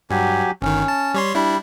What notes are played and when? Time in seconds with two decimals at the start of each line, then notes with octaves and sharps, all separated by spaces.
0.10 G2 F#3 G4 G#5
0.62 G1 D#3 C#4
0.88 A5
1.14 G3 C#5 C6
1.35 G3 D4 E4